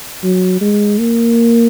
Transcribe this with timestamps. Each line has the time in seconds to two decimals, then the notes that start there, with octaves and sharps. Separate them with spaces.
0.23 F#3
0.61 G#3
0.99 A#3